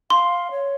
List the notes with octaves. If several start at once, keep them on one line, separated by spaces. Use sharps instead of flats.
F5 C6
C#5